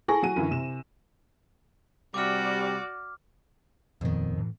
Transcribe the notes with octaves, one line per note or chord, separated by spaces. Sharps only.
E4 G#4 A4 G#5 C#6 A#6
F#3 F#4 D#7
F#2 D3 E3
C3 E7
C3 G3 F#4 D5 D6 F6
D#1 F2 A#2 D#3 B3
A2 E3